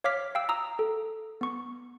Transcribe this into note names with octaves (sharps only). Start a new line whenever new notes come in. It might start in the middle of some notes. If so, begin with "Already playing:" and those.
C#5 F5 D6 F6 B6
F5 G5 E6
A#5 D#6 E6
A4
B3 C#6